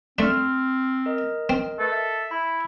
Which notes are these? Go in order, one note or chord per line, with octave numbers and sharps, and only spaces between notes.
A3 C4 D4 C6 F6
A#4 D#5
C4
A4 B4
E5
E4 B5